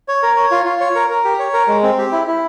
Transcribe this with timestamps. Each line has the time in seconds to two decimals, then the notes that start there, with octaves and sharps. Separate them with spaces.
0.08 C#5
0.23 A#4
0.36 C#5
0.51 F4
0.66 F4
0.81 C#5
0.95 A#4
1.10 A#4
1.25 G4
1.39 C#5
1.54 A#4
1.68 G#3
1.83 C4
1.98 G4
2.12 E4
2.27 E4